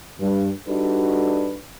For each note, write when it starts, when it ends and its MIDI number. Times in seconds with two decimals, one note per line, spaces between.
0.20 0.49 43
0.67 1.57 55
0.67 1.57 62
0.67 1.57 63
0.67 1.57 66
0.67 1.57 69
0.67 1.57 71